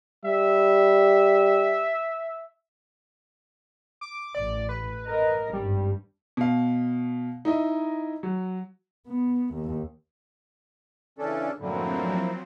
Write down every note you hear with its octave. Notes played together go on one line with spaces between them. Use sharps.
G3 E5
D6
A1 D5
B4
A#4 D#5
G#1 G2 G3
B2 F5
D#4 E4 D#5
F#3
B3
D#2
C#3 E3 C#4 D4 A4
F#2 A2 D3 F3 F#3 A#3 C4 E4